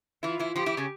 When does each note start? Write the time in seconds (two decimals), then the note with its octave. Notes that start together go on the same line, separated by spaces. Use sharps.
0.23 E3 E4 F4
0.39 E3 E4
0.56 F3 F4 G4
0.66 E3 E4
0.77 C#3 C#4